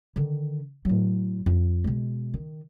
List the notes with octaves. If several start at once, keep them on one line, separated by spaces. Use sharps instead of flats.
D3 D#3
A2 F#3
F2
B2 G#3
D#3